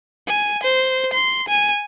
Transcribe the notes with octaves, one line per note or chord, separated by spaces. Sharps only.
G#5
C5
C6
G#5